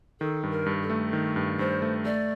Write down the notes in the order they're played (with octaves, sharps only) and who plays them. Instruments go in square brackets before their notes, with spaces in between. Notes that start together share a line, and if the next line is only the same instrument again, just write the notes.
[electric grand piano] D#3 [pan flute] A4
[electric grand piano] G2
[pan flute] A#4
[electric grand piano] G2
[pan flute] A4
[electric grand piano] A3
D#3
G2
[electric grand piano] G2 [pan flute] C5
[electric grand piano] A3
[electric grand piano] A3 [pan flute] D5